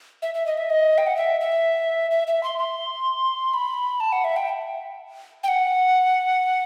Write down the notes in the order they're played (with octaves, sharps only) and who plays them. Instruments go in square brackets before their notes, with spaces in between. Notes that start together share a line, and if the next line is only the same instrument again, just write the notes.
[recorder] E5
E5
D#5
E5
D#5
G5
F#5
E5
E5
E5
E5
C6
C6
B5
A5
F#5
E5
G5
G5
F#5